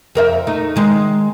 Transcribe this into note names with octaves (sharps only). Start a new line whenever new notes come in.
F2 A#4 E5
A3 D#4
D#3 G#3